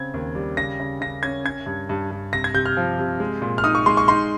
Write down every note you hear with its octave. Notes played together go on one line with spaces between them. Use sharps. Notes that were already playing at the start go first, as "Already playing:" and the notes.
Already playing: C#3 C4 G#6
D#2
G3
C#3 A#6
C#3
C#3 A#6
C#4 G#6
C#4 G#6
G2
G2
G2
C3 A#6
G#6
C3 G6
F6
F3
C3
G#3
A#2
F6
D#4 D#6
C#6
G#3 C6
C#6
D#4 C6